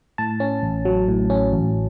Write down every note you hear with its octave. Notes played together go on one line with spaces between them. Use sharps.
A2 A5
C#4
A1
F#3
A2
C#4
A1